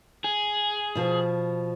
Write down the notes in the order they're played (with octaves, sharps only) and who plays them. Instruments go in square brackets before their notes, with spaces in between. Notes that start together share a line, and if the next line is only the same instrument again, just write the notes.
[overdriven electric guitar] G#4
[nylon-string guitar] B2 F3